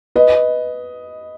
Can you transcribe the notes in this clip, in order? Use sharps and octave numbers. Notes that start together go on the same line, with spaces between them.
B4 D#5